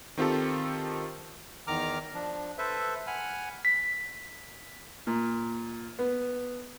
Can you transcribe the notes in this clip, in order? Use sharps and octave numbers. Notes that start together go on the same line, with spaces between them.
D#3 C4 F4 G4 A4
E2 D#3 A#5 D6 F6
F3 D4
A4 B4 C5 E5
F#5 G#5 B5 F6
B6
A#2
B3